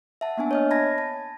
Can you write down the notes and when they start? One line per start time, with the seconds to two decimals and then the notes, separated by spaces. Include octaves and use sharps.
0.21 E5 F#5 A5
0.37 A#3 B3 D4 G#5
0.51 C#5 D#5 F6
0.71 A5 B5 G#6 A#6
0.98 A5